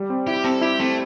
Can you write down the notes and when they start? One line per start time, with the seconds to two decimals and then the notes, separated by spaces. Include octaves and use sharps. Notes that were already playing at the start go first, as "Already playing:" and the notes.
Already playing: G3
0.10 C4
0.27 E4 G4
0.44 C4 A4
0.61 E4 G4
0.79 A3 C4